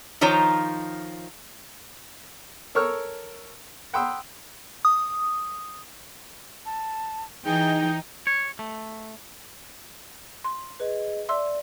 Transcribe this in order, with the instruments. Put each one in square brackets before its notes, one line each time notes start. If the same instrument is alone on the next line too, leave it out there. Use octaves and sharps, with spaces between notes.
[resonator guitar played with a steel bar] D#3 F3 D#4 F4 C#5 A#5
[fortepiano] A4 A#4 C#5 C#6 E6 F6
F#5 G5 B5 C6 D#6 E6
[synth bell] D#6
[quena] A5
[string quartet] E3 [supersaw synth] D#4 [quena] G#4 [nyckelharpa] G5
[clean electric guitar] C#5
A3
[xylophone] C6
[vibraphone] G#4 D#5 [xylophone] B4
[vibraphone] D5 [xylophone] E5 C6 E6